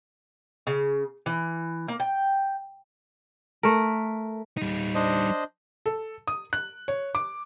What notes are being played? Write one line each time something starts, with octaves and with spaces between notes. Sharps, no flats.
C#3
E3
A#3
G5
A3 A#4
G3 D#4
D4 C5 D#5
A4
D#6
F#6
C#5
D6